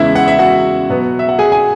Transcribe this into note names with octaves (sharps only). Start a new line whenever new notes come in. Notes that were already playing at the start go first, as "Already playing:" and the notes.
Already playing: E2 C#3 E3 G#3 E4 E5
F#5
E5
F#4 F#5
B2 F#3 B3
E5
F#5
G#4 G#5
G#5